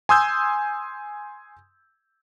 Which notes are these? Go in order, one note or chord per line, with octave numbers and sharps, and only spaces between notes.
G#5 C6 D#6 E6 G6 G#6